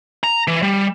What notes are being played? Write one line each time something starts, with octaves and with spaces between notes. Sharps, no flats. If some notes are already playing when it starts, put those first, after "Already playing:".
A#5
E3
G3